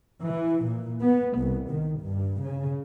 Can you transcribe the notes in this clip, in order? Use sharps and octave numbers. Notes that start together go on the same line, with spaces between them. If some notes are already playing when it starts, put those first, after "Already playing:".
E3
A#2
B3
C2
D#3
G2
C#3